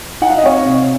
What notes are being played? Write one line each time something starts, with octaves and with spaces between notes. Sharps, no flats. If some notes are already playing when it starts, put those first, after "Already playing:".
D#4 F#5
F5
D#5
C4 C#5 F5
C3